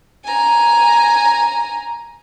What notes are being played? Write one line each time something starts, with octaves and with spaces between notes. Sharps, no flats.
G#5 A#5